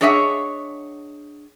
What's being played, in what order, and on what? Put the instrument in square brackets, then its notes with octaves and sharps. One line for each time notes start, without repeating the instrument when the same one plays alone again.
[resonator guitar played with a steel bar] D4 G#4 C#5 D#5 E5 F#5